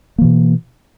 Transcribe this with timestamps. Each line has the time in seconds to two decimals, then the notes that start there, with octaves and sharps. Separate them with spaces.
0.18 A#3
0.21 E3
0.24 B2